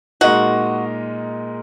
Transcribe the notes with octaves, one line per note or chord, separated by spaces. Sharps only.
A#2 G#3 D#4 F#4 A#4 D#5